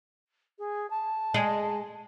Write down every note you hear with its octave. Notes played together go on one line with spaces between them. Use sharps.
G#4
A5
G#3